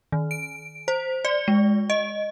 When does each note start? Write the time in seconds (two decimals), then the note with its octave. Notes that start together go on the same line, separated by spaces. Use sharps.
0.12 D#3
0.31 D7
0.88 C5
1.25 D5
1.48 G#3
1.90 D#5